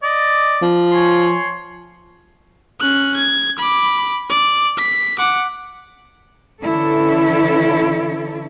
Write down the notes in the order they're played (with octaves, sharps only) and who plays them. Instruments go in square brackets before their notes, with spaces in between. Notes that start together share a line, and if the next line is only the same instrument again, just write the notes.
[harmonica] D5 D#5
[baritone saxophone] F3
[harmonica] C#5 G#5 C6
[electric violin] C#4 F#6
G#6
B5 D6
D5
B6
F#5 D6
[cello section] D3 E3 C#4 E4 A4